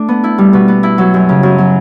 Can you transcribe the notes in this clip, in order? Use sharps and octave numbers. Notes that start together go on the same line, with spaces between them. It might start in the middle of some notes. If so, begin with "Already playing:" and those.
Already playing: A3 D4
B3
E4
G3
B2
B3
E4
F#3
F#2
C#3
F#2
F#3